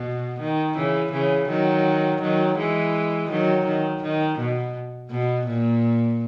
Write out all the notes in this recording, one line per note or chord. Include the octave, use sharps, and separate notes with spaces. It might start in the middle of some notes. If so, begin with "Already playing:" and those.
Already playing: B2
D#3
C#3 E3
C#3 E3
D#3 F#3
D#3 F#3
E3 G#3
D#3 F#3
D#3
D#3
B2
B2
A#2